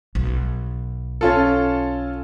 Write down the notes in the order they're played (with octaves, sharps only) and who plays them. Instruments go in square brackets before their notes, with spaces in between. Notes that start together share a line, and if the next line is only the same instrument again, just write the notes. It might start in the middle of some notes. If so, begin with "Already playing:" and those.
[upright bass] B1
[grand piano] C#4 F4 A4